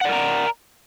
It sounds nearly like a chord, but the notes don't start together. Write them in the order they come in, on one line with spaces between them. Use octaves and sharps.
F#5 D5 A#4 A#5